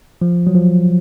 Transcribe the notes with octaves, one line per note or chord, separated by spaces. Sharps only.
F3
F#3
F3